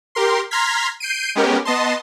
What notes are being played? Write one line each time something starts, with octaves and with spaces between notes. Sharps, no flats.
G4 A#4 C6
A#5 C6 F6 G#6 B6
G6 C7 D7 D#7
G#3 B3 C#4 G4 A#4
B3 D#5 A5 C6